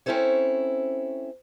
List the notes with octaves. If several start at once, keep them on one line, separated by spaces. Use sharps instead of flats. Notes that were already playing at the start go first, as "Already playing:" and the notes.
C4 C#4 E4 A4 C5 C#5